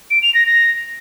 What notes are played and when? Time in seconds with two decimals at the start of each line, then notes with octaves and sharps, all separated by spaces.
0.10 D7
0.22 F7
0.34 A#6
0.46 A#6